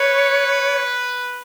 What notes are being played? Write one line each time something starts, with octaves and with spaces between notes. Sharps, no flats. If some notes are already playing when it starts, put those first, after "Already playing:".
Already playing: B4 C#5